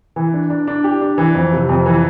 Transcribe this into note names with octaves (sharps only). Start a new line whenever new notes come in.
E3
D4
D4
D4
G4
D4
E3
F2
C3
F2
E3